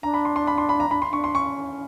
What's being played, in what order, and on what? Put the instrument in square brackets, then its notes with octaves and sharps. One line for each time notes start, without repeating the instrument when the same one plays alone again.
[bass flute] D4 [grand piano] A#5
[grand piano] B5
C6
C6
B5
C6
B5
A#5
[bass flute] D4 [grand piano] B5
[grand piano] C6
[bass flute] D4 [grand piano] C#6
[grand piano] C6
[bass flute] C#4 [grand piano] C#6